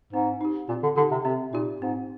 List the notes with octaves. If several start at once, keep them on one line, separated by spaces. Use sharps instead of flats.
G#2 C4
D#4 G4
A#2 C4
D3
D3 D#4 G4
C3
C3 C4
A#2 D#4 G4
G#2 C4